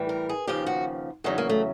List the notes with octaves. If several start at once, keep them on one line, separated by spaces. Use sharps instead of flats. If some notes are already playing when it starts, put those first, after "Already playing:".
Already playing: A2 E3 G3
A#4
G#4
D#2 C#3 F3 G4
F#4
E2 C#3 F#3 D#4
A#3
A3